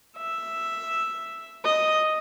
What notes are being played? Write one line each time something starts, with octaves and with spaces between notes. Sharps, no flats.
E5
D#5